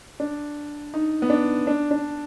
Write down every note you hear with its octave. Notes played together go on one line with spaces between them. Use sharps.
D4
D#4
B3
D4
D4
D4